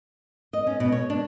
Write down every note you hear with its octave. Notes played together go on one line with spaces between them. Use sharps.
D#5
C#4
B2
C#5
D4